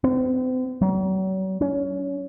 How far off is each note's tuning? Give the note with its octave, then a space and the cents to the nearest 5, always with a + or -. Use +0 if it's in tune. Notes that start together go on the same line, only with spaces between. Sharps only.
C4 -40
F#3 +40
C#4 +20